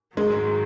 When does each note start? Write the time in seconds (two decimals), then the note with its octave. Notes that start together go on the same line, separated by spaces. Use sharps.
0.17 G#2 D#3 F#3 G#3